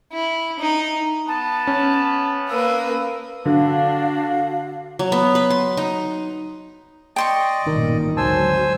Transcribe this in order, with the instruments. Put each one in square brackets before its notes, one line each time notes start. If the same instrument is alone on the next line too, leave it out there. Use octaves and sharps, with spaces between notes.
[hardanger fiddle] E4
D#4
[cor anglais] B3 [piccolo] A5
[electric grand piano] C#4
[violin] A#3 B4 [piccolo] E6
[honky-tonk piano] D3 [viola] D4 [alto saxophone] F#4 [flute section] F5
[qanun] F#3
B3
B4
C6
D#4
[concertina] D5 D#5 [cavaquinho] G5 C6 C#6
[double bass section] A1 G2 A#2 [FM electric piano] D#3 D#4 A#4
[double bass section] G#1 D2 F#3 [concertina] C5 G#5 E6 [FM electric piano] A5